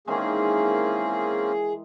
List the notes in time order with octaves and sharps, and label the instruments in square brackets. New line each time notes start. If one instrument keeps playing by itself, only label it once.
[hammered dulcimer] D#3 E3 G#3 [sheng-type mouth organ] A#3 C4 C#4 [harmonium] G#4